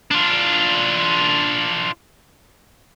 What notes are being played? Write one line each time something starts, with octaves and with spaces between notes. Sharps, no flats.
D4 F4